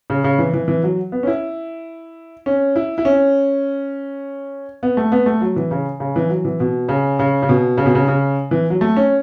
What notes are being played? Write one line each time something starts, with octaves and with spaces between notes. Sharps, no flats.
C#3
C#3
E3
E3
E3
F#3
B3
C#4
E4
C#4
E4
E4
C#4
B3
A3
B3
A3
F#3
E3
C#3
C#3
E3
F#3
E3
B2
C#3
C#3
C#3
B2
C#3
B2
C#3
C#3
E3
F#3
A3
C#4